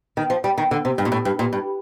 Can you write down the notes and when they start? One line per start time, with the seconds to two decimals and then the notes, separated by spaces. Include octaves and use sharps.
0.17 D#3
0.30 F3
0.44 G3
0.58 D#3
0.71 D3
0.85 C3
0.98 G2
1.05 A#2
1.12 A2
1.25 G2
1.39 A#2
1.53 G2